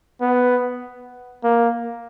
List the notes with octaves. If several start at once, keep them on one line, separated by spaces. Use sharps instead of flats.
B3
A#3